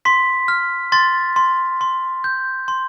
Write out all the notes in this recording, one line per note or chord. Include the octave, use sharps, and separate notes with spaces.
C6 B6
F6
C6 A6
C6
C6
G6
C6